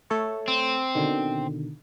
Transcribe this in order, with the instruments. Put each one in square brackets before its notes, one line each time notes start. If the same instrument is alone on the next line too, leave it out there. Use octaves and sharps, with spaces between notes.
[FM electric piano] A3 A4 C#5
[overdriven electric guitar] C4
[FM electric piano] B2 D3 D#3